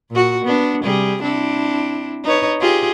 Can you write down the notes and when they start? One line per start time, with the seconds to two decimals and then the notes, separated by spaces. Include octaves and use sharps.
0.11 A#2 F#4
0.45 B3 D4
0.83 C3 G3 G#4
1.23 C4 D4 E4
2.24 D#4 B4 C#5
2.61 F4 G4 G#4